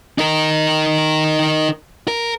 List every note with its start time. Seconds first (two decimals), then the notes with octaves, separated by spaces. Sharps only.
0.18 D#4 A#4
2.08 A#4